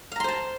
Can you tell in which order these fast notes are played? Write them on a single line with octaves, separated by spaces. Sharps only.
F5 A#5 C6 C5 A5